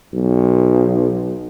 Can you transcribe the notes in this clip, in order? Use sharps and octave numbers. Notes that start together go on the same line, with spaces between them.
B1